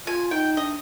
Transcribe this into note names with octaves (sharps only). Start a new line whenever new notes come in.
F4 G#5
D#4 G5
D4 D#5